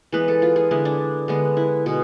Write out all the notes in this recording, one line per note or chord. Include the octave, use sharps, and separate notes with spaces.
E3 G#3 B3 B4
A4
F4
G#4
D3 G#3 B3 E4
D4
D3 G#3 B3
E4
B2 G#3